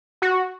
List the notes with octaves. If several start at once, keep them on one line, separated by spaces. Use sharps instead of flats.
F#4